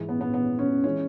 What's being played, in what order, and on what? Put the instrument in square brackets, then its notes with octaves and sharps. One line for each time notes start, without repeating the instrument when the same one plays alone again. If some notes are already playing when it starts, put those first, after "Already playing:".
Already playing: [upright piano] G#2 E3 G#3
B3
B3
B3
C#4
E3 G#3 C#4